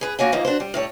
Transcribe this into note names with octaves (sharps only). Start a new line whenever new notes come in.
G#4 B4
D3 A#3 F#4 C#5 G#5
D#2 E3 F3 A#3 D#4
D4 F#4 C5
G3
A2 G3 C#5